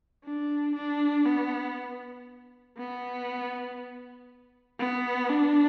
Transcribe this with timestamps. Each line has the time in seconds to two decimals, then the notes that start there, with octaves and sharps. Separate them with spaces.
0.24 D4
0.75 D4
1.26 B3
2.77 B3
4.79 B3
5.30 D4